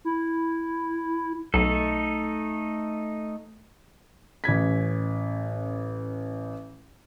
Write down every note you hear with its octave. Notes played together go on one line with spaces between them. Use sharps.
E4
B1 A3 D#4 A4
A1 C#4 G#6 B6